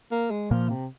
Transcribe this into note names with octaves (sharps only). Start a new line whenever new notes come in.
A#3
G#3
A#2 F3 A#3
C3